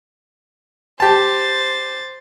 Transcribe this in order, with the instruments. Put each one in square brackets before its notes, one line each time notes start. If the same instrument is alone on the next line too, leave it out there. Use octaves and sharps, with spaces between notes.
[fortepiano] G4 A5 [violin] C5 A6